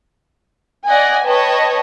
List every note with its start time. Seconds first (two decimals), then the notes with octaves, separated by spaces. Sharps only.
0.87 D5 D#5 F#5 G#5
1.25 B4 C#5 D#5 G5 A5